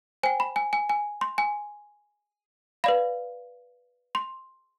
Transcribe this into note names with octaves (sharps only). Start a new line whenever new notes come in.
C5 G5 G#5
B5
G#5
G#5
G#5
C6
G#5
B4 D5 F5 B5
C6